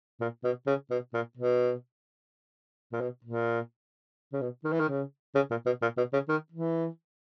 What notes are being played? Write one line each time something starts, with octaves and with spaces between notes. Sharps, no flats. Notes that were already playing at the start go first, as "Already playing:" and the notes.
A#2
B2
C#3
B2
A#2
B2
A#2
B2
A#2
C#3
B2
D#3
E3
D#3
C#3
C#3
A#2
B2
A#2
B2
C#3
D#3
E3